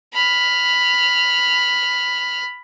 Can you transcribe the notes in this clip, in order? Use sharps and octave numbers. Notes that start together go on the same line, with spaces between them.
B5 F6